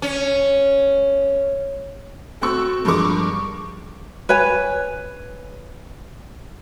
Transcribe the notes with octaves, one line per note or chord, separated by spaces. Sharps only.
C#4
A3 C4 F#4 A4 C#6 E6
G2 F3 G#3 A#4 C#6 D6
B4 C#5 G#5